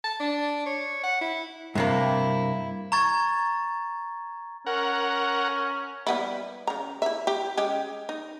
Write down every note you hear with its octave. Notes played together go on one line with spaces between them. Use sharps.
A5
D4
C#5
F#5
E4
G2 C3 A#3 E4
A#5 C#6 G#6 A6
C#4 A#4 F#5
G3 B3 E4
C#3 A#5
E4 E5
G4
G#3 C#4 G4
D#4